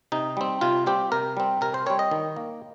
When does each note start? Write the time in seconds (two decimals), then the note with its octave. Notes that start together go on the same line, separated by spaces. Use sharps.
0.12 C3 D#4
0.37 G3 C4
0.61 C3 F4
0.86 G3 C4 G4
1.12 C3 A#4
1.37 G3 C4
1.61 C3 A#4
1.74 C5
1.86 G3 C4 C#5
1.99 D#5
2.11 D#3
2.36 A#3